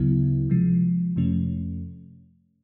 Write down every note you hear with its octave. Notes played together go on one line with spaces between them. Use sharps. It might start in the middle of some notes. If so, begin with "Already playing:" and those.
Already playing: D2 C#3 F#3 B3 E4
C3 F3 G#3
F2 C3 F3 A3 C#4